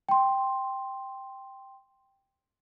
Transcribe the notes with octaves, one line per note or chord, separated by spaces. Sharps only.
G5 C6